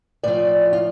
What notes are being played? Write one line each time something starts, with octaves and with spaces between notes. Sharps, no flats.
A2 F3 D5
F4